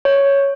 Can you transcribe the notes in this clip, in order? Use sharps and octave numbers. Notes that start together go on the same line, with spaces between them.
C#5